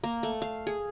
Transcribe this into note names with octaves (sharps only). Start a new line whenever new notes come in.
A#3
A3
F5
G#4